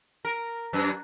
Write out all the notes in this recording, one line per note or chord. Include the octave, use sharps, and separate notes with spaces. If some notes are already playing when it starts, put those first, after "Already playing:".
A#4
F#2